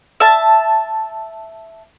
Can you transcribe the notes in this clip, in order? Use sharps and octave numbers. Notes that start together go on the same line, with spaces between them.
E5 A5